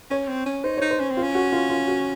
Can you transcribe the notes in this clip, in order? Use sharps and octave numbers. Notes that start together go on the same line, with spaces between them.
C#4 C#5
C4
C#4
D#4 C5
D#4 C#5
C5
C#4
C4
F4
C#4
F#4
F4
F4
F#4